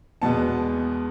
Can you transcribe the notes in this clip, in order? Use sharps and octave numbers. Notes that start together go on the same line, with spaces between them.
E2 B2 G#3 B3 A5